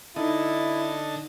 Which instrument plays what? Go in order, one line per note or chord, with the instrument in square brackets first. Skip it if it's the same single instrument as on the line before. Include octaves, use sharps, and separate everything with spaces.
[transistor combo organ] D3 A4 D#5 [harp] D#4 [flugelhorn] E4